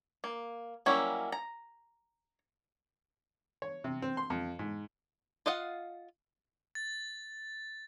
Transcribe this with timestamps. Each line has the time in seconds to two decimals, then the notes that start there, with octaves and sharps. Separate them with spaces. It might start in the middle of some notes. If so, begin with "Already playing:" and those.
0.24 A#3
0.86 F#3 G3 A#3 C#4 E4
1.32 A#5
3.62 C#5
3.84 C3
4.02 C4
4.17 C6
4.30 F2
4.59 G#2
5.46 F4 D#5 F5 F#5
6.75 A6